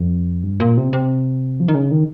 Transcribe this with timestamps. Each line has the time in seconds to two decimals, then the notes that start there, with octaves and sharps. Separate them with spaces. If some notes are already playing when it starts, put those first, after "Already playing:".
Already playing: F2
0.43 G2
0.60 A#2
0.77 C3
0.93 C3
1.60 F3
1.68 D#3
1.75 C#3
1.91 D#3